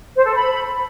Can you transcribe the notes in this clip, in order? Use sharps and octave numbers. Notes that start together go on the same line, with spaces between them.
C5
A4
B5